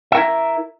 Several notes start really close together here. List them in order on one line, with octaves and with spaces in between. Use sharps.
E5 A#4 E4